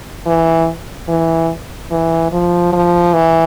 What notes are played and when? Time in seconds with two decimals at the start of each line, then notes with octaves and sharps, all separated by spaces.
0.26 E3
1.09 E3
1.91 E3
2.32 F3
2.73 F3
3.14 E3